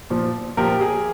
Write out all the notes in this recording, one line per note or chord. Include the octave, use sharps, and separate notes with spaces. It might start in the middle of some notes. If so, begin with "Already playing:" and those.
A#2 F3
A#2 F3 G4 A#4
G#4